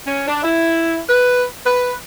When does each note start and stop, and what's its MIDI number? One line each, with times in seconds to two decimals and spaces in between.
0.07 0.26 61
0.28 0.43 62
0.43 1.00 64
1.09 1.45 71
1.65 1.94 71